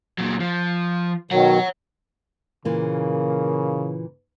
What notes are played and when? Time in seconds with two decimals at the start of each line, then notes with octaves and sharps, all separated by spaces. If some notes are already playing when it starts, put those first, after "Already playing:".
0.18 A#2 F#3
0.40 F3
1.31 B2 D#3 F#3 C#5 F#5
2.65 A#2 C#3 E3 A#3